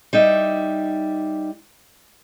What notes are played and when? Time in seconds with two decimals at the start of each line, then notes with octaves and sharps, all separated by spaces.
0.13 G3 D#4 E5